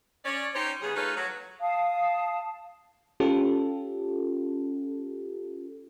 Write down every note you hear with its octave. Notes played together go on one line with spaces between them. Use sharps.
C#4 C#5 D5
C#4 D#4 G4 C5 C#5
C#3 G3 B3 G#4
A3 D#4 F4 G#4 B4 C#5
F#3
F5 A5 D#6
C#4 F4 G4 A4